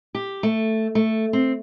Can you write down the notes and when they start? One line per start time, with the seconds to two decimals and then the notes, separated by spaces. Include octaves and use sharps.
0.15 G4
0.43 A3
0.95 A3
1.33 C4